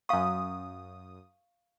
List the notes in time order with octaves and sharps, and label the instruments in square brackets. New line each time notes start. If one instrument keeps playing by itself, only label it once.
[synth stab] F#2 D#6 [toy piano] F5 C#6